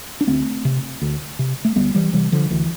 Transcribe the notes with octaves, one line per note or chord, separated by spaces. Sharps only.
D4
D2 A3 C4
C3
D2
C3
A3
D2 G3 B3
E3 G3
C3 E3 G3
D3 F3
D2 E3